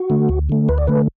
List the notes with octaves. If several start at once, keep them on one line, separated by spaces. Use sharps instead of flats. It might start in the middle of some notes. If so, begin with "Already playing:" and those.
Already playing: F#4
D3 A3
D2
D3 A3
D2 B4
D5
D3 A3 B4